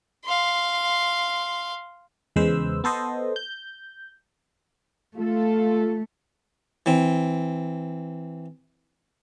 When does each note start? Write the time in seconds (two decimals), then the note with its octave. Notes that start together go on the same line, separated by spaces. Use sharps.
0.25 F5 C6
2.36 E2 C#3 G#3 B4 C5 E6
2.84 B3 A4 C5 D#5
3.36 G6
5.16 A3 F4 A4
6.86 E3 C4